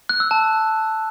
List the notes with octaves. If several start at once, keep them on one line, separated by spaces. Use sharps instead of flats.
F#6
E6
A5